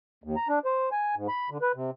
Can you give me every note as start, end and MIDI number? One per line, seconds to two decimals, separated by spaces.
0.24 0.36 39
0.36 0.48 82
0.49 0.59 62
0.65 0.89 72
0.92 1.15 80
1.15 1.27 44
1.28 1.49 83
1.50 1.58 50
1.62 1.72 71
1.75 1.90 48